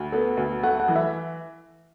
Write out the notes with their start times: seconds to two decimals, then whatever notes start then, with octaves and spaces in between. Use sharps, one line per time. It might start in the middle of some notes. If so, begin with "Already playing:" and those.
Already playing: D2
0.12 B3 A4
0.37 D2
0.63 A3 F#5
0.80 F#5
0.88 E3
0.96 E5